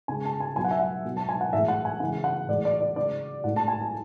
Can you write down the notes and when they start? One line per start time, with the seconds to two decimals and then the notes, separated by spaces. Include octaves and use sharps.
0.08 C#3 G#3 G#5
0.25 A5
0.40 G#5
0.56 B2 F#3 G#5
0.64 F#5
0.71 E5
0.79 F#5
1.05 B2 F#3
1.17 A5
1.29 G#5
1.41 F#5
1.53 A2 E3 G#3 E5
1.68 F#5
1.85 G#5
2.00 C#3 E3 G#3 F#5
2.24 F#5
2.48 A2 E3 G#3 D5
2.65 D5
2.81 D5
2.96 C#3 G#3 D5
3.44 A2 G#3 F#5
3.56 A5
3.68 G#5
3.81 A5